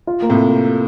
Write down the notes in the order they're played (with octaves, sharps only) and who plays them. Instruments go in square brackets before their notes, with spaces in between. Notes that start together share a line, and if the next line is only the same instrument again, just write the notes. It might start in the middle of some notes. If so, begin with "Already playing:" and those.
[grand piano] F4
A#3
[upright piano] A2 C3